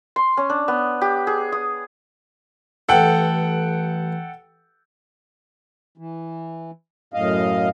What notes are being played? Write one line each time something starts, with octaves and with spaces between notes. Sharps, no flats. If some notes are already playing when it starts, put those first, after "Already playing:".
C6
C#4
D4
B3
G4
G#4
D#6
A1 G2 A4 F#5 G5
E3
F#2 A2 D#5 F5